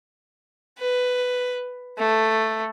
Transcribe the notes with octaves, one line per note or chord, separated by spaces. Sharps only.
B4
A3